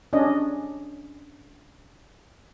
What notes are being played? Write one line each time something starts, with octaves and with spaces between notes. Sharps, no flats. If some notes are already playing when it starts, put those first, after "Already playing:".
C#4 D4 D#5